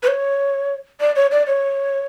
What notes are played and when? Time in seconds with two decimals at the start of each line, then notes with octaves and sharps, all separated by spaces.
0.03 B4
0.08 C#5
1.01 D5
1.16 C#5
1.32 D5
1.47 C#5